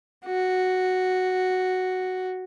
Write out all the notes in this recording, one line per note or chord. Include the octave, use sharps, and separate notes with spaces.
F#4